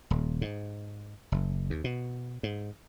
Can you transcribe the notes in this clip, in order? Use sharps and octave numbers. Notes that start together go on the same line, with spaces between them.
D#1
G#2
F#1
D#2
B2
G#2